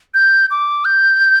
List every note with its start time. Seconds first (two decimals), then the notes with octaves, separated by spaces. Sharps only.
0.14 G6
0.51 D6
0.85 G6